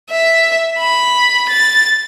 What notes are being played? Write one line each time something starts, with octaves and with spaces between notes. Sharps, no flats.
E5
B5
A6